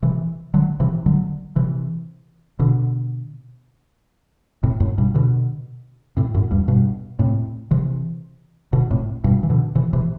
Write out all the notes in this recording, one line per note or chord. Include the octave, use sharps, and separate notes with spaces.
C3 E3
D3 F#3
C3 E3
D3 F#3
C3 E3
B2 D3
A2 C3
F#2 A2
G2 B2
B2 D3
A2 C3
F#2 A2
E2 G2
G2 B2
A2 C3
C3 E3
B2 D3
A2 C3
G2 B2
E3
B2 D3
C3 E3
C3 E3